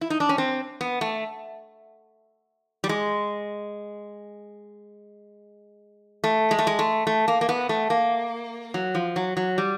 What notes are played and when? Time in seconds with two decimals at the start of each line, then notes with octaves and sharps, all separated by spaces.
0.01 E4
0.10 D#4
0.20 D4
0.29 C#4
0.38 C4
0.81 B3
1.01 A3
2.84 G3
2.89 G#3
6.24 A3
6.51 G#3
6.59 A3
6.67 G#3
6.79 A3
7.07 A3
7.28 A#3
7.41 A#3
7.49 B3
7.69 A3
7.90 A#3
8.74 F#3
8.95 F3
9.16 F#3
9.37 F#3
9.58 G3